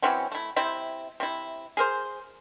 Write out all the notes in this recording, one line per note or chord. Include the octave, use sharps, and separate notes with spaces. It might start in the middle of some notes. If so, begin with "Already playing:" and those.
E3 F#3 C4 C#4
A3 E4
C3 C4 E4
C3 E4
G#4 A#4 C5